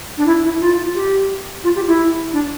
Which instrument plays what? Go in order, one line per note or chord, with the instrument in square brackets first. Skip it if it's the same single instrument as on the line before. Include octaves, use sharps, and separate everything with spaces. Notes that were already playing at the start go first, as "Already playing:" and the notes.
[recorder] D4
E4
E4
F4
G4
F4
G4
E4
D4